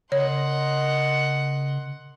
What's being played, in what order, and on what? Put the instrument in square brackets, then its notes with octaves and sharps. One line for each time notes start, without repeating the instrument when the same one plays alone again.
[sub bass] C#3 [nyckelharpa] A#4 D#5 [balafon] C#5 [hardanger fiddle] F#5 C6